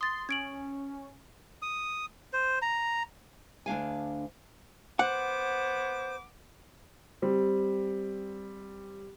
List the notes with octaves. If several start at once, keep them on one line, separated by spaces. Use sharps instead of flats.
C6 D#6 A6
C#4 G#6 D7 F#7
D#6
C5
A#5
D2 D4 F5 G#5
B3 C5 F#5 D6
G3 C4